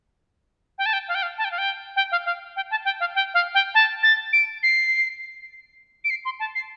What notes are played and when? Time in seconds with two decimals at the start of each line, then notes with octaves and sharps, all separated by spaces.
0.78 G5
0.86 A5
0.93 G5
1.08 F5
1.15 G5
1.22 F5
1.38 A5
1.45 G5
1.51 F5
1.58 G5
1.96 G5
2.12 F5
2.26 F5
2.56 G5
2.71 A5
2.85 G5
3.00 F5
3.15 G5
3.34 F5
3.54 G5
3.74 A5
4.03 A6
4.33 D7
4.63 C7
6.04 D7
6.10 C7
6.25 C6
6.40 A5
6.55 C7